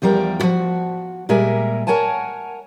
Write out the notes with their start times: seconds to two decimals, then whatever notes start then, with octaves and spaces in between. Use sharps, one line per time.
0.02 E2 F3 G3 A#4 G5
0.40 F3 F#4
1.29 A#2 G3 G#3 A#4 E5 G#5
1.87 A#4 C#5 F#5 G#5 A5